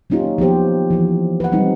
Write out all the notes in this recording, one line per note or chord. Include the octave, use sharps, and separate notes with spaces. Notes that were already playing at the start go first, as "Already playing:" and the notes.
F#3 A#3 C#4 D#4 F4 G4
F3 B3 G4 C5
E3 F3
B4 F#5
F#3 G3 C4 D#4